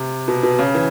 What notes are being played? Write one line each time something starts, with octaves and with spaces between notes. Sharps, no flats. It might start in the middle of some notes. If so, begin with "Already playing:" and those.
Already playing: C3
B2
B2
C#3
E3